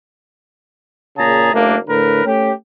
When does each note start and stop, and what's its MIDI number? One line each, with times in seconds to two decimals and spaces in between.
1.17 1.50 46
1.17 1.50 49
1.17 1.50 68
1.17 1.50 81
1.17 1.50 82
1.53 1.77 30
1.53 1.77 57
1.53 1.77 58
1.53 1.77 62
1.88 2.23 45
1.88 2.23 50
1.88 2.23 70
1.88 2.23 71
2.25 2.52 57
2.25 2.52 61
2.25 2.52 67